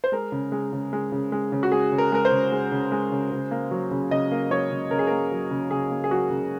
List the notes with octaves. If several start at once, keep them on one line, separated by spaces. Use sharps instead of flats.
C5
G#3 A#4
C#3
G#3
C#3
G#3
C#3
G#3
C#3
F#4
G#3 G#4
C#3
A#4
G#3 A#4
C5
C#3
G#3
C#3
G#3
C#3
C#3
A#3
F#3
C#3
C#3 D#5
A#3
F#3 C#5
C#3
C#3 A#4
G#4
A#3 A#4
F#3
C#3
C#3 G#4
A#3
G#4
F#3 F#4
C#3